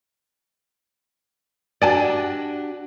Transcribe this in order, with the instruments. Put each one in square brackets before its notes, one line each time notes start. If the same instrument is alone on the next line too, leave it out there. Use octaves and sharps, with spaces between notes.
[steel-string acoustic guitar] D4 F#4 G4 [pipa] D5 G#5 A5